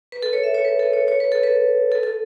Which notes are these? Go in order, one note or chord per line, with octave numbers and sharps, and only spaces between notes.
B4
A4
C#5
E5
C#5
B4
A4
C#5
C#5
B4
A4
B4
A4
A4